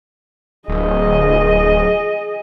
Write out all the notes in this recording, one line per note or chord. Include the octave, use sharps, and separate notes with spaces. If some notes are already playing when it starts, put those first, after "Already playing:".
D1 G#4 D#5